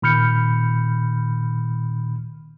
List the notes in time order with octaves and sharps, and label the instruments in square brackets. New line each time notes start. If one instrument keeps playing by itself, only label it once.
[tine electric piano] A#2 D#3 B5 F6 G6 C#7